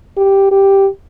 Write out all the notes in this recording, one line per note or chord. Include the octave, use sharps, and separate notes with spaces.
G4
G4